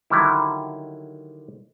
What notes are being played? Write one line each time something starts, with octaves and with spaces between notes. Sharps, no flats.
D3 D#3 F#3 G3 E4